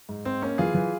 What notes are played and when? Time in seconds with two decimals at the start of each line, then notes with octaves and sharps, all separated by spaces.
0.09 G#2
0.25 G#2 C4
0.42 A#3 C#4
0.58 E3 F4 G#4
0.75 E3